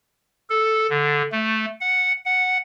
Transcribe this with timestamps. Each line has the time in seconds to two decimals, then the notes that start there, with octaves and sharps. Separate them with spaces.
0.50 A4
0.90 D3
1.32 A3
1.81 F#5
2.25 F#5